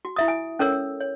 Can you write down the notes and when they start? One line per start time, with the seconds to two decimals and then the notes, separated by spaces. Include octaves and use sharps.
0.05 F#4
0.16 E4 E5 D#6
0.28 G#5
0.59 C#4 A4 A#4 C#5 E6
1.00 C#5